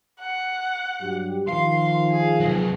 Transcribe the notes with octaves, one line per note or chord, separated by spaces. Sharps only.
F#5
G2 F#3 G4
D#3 F3 F5 C6
G#4
C3 F#3